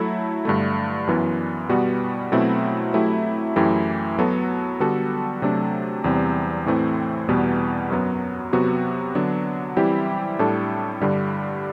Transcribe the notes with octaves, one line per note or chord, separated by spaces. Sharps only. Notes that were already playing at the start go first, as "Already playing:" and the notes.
Already playing: F#3 A3 E4 A4
G2 D3 A3
F#2 E3 B3
B2 G3 B3 F#4
B2 F#3 A3 C4 E4
F#3 A3 E4 G4
F#2 E3 A3 E4 G4
F#3 B3 F#4 A4
D3 G3 B3 F#4 A4
C3 F#3 A3 D4
E2 C3 G3 C4
A2 E3 A3 C4
E2 B2 G3 B3
F#2 F#3 B3
C3 F#3 B3 F#4
D3 F#3 B3 D4
E3 G3 C4 E4 G4
A2 G3 D4 A4
G2 D3 G3